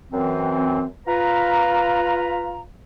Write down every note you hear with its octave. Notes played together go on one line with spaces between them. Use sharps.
F#2 E3 C4
F4 B4 A#5